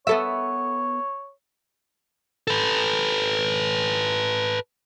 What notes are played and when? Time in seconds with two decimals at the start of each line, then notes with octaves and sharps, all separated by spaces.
0.07 B3 A4 C#5 E5
2.47 A4 B4